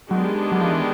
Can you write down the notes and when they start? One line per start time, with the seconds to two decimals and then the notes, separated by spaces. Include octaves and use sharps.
0.10 D#3 F#3 G#3 B3 D4 G4
0.52 F#3
0.61 F3
0.71 E3